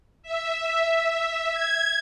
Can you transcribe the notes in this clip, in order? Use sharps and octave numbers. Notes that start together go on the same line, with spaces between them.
E5
G#6